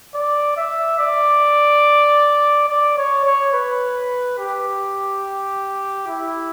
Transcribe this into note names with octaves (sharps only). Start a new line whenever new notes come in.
D5
E5
D5
D5
C#5
C#5
B4
G4
E4